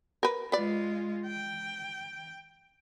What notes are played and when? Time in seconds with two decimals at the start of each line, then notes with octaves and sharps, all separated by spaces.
0.23 A#4 B4
0.52 G#3 F4 B4 D5
1.26 G5